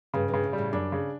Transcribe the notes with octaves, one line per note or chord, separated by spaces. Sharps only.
G2 C#3
G2
C#3
A2
G3
A2
F#2 D4
C#3